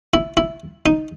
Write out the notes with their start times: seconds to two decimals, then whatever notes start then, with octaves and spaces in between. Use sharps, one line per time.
0.14 E4
0.37 E4
0.86 D#4